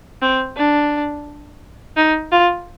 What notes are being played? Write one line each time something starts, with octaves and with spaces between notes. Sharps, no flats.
C4
D4
D#4
F4